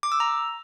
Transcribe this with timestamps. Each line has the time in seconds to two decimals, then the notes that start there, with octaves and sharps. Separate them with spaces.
0.03 D6
0.12 E6
0.20 A#5